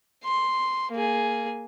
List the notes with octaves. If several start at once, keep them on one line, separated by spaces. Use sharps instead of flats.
C6
A#3 G#4